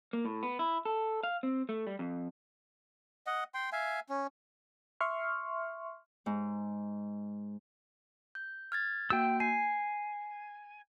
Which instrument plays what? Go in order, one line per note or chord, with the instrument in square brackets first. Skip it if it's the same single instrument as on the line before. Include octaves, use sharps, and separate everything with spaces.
[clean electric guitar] A#3
A2
B3
E4
A4
F5
C4
A3
G3
F2
[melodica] D#5 F#5
G5 C6
E5 F5 G#5
C#4
[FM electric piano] E5 C6 C#6 F6
[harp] G#2
[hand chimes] G6
F6 G#6 A6
[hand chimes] A#3 F#4 G6 [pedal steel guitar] G5 E6
[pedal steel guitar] G#5 [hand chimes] C7